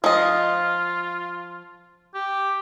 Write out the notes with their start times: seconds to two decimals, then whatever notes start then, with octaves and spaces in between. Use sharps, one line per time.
0.04 F3 F4 D#5
2.14 G4